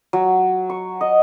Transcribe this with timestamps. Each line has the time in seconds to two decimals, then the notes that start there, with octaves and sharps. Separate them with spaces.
0.13 F#3
0.70 C#6
1.01 D#5